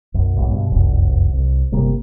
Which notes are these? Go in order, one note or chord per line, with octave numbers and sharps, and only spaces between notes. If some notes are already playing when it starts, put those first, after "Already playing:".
B1 F#2
B1 G#2
G2 B2
F1 C2 F#2
C2
G1 C3 G3 A#3